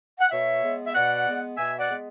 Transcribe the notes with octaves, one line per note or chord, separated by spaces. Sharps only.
F#5
B2 C#5 E5
G#3 B3
E5
B2 D5 F#5
G#3 B3
B2 E5 G#5
D5 F#5
G#3 B3